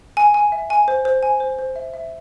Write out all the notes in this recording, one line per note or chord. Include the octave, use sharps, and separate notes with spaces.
G#5
G#5
E5
G#5
C5
C5
G#5
C5
C5
E5
E5